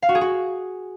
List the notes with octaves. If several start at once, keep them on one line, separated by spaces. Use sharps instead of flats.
F5
F#4
G#4
F#4